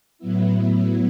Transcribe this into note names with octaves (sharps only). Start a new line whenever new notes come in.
A2 F#3 B3 E4